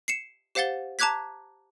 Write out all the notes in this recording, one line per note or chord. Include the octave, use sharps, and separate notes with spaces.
C7 C#7 E7
G4 C5 F5 F#5 A6 G7
A5 A#5 D6 F#6 G#6 B6